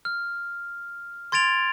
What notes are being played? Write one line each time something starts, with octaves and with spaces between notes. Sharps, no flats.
F6
C6 G#6 A6 D7 F7